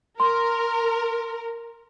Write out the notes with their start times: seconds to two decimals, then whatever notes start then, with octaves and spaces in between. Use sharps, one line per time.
0.20 A#4 C6